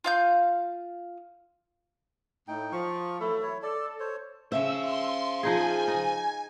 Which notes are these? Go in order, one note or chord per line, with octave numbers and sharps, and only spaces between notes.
F4 F5 G6
A2 D#4 G5
F3 C#6
E3 F#3 A3 E4
E4 C#5
A4 D5
C5 C#5
C#3 C5 E5 F5 E6
C6
F3 D#4 G#4 G#5
D#4